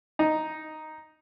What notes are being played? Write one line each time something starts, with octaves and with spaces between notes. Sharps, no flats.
D#4